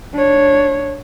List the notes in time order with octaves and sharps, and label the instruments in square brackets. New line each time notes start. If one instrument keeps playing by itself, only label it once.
[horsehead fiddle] D4 C#5